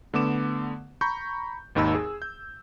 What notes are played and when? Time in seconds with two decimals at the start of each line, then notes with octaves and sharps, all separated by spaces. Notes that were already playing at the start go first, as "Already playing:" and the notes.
0.14 D3 A3 B3 D6 E7
1.01 A#5 B5 C#6 G6
1.75 G#1 D#2 D#4 B5 E6
1.95 G#4
2.22 G6